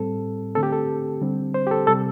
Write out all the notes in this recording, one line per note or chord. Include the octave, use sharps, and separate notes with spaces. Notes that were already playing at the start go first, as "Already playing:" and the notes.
Already playing: A2 G3 C4 A4
D3 A3 C4 A4
G4
A4
D3 G3 C4
C5
G4
A4
C3 G3 C4 A4